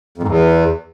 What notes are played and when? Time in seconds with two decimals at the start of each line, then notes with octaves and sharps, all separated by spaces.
0.18 F2
0.23 G#2
0.28 E2